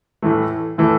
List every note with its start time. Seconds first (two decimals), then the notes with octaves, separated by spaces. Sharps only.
0.22 A2 E3 A3
0.78 A2 E3 A3